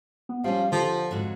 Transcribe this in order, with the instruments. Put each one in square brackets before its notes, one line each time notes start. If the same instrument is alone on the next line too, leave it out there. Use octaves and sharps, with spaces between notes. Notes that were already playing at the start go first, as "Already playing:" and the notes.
[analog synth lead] B3
[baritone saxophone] F3 [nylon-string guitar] G3 C#4 [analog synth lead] F5
[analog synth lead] D3 [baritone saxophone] F3 [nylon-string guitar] G4
[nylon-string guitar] F2 G#2 F#3